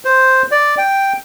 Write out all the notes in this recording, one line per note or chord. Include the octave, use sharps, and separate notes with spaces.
C5
D5
G5